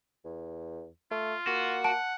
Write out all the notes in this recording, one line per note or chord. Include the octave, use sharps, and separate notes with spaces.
E2
A3 F4
A#3 F#4
F#5 A5 D7